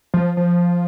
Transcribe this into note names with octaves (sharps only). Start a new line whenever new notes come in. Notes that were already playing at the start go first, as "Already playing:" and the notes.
F3
F3